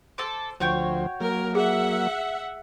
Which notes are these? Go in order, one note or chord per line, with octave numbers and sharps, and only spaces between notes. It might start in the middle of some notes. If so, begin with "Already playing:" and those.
A4 C5 D6
D2 F3 F#4 C5 C#5 G5
F#3 A#3 A#4
G#4 E5 F#5